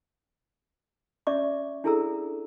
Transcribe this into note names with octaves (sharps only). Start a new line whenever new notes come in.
C#4 D5 E5 C#6 D6
D4 E4 G#4 A4 A#5 E6